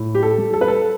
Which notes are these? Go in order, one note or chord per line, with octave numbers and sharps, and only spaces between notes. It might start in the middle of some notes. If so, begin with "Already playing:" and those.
Already playing: A2
G4
A4
G3
A4
B4
A4